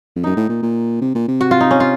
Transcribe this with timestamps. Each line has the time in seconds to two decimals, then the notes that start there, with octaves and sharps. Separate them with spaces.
0.16 F2
0.24 F#2 D#4
0.36 A2
0.49 A#2
0.63 A#2
1.01 C3
1.15 A#2
1.28 C3
1.41 F#4
1.51 F4
1.61 D#4
1.71 C#4
1.80 F4